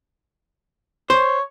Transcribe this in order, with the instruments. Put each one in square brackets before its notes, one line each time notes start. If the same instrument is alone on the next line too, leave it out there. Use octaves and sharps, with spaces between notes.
[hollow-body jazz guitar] C5 [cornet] C#5